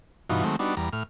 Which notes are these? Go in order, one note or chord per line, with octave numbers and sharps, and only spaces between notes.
G2 B2 E3 D#4 F4 F#4
D#3 F#3 G#3 A3 C4
G3 B3 D4 D#4 F#4
E2 G3 A#5
A2 F6